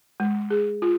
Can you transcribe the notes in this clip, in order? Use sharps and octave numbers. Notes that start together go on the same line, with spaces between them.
G#3
G#4
F4